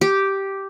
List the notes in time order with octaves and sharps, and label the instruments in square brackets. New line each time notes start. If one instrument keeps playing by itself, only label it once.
[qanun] G4